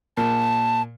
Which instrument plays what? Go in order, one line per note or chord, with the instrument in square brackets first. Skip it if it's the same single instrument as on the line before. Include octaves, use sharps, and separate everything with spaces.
[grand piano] A#2 [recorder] A5